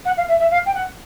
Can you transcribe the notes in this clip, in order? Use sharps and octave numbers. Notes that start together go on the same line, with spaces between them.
F#5
F5
E5
E5
F5
G5
F#5